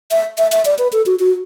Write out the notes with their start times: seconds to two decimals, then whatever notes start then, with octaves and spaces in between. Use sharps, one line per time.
0.11 E5
0.38 E5
0.52 E5
0.65 D5
0.79 B4
0.93 A4
1.06 F#4
1.20 F#4